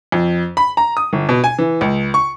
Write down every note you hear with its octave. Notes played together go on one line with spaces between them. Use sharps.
F2
B5
A#5
D#6
G1
B2
G#5
E3
C#2
C#6